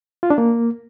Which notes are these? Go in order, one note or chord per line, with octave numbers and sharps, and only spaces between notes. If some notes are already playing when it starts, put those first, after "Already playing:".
F4
D4
A#3